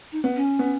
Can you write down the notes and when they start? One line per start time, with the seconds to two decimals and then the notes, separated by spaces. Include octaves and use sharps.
0.12 D#4
0.24 B3
0.36 C#4
0.59 B3